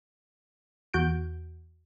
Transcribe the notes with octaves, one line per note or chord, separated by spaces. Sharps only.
E2 F#4 G6 D7